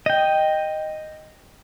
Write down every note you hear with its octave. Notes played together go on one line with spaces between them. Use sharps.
D#5 G5